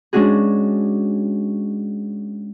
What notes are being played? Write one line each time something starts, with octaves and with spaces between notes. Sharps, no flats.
G#3 C#4 D4 F#4 G#4